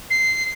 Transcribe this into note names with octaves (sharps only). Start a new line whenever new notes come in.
C7